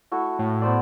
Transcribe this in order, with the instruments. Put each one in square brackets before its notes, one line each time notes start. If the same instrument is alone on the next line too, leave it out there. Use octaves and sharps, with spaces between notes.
[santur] A3 E4 F#4
[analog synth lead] A2
[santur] B3 C5 D5